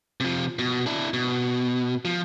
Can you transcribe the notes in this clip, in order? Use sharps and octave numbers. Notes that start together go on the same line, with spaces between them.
C3 F3
B2
D4 E4
B2
F3